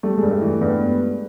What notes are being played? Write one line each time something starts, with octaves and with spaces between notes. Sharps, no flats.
G3 A3
G2 G#3
A3
E3
G2 B3